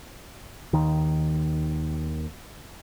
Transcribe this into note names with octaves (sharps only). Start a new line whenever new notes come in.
D#2 D#3